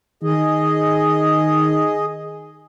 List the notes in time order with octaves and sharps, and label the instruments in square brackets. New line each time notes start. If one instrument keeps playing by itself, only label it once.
[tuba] D#3 [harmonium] G#4 D#5